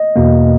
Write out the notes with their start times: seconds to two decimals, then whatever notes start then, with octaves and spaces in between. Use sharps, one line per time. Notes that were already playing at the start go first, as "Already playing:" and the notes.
Already playing: D#5
0.16 E2 B2 A#3